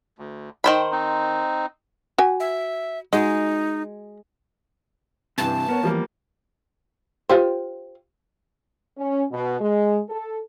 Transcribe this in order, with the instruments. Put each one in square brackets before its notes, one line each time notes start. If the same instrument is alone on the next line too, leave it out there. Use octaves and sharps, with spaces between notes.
[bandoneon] D2
[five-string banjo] D#3 C5 B5 [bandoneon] G5
[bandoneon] C4 D#4
[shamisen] F#4 G#5
[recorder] E5
[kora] G#3 G#4 [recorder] D#4 [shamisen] F#4
[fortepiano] G2 E3 [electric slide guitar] C3 [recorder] A5
[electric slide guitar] B3 [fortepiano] A#4 C#5
[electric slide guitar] E2 [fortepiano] F3 G3 A#3
[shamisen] F4 G4 C5
[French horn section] C#4
B2
G#3
A4